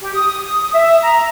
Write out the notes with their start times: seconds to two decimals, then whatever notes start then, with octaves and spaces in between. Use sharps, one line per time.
0.01 G4
0.15 D#6
0.44 D#6
0.73 E5
1.02 A#5